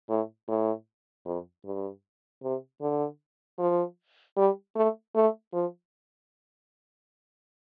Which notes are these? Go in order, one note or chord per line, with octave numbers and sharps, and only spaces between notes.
A2
A2
F2
G2
C3
D3
F3
G3
A3
A3
F3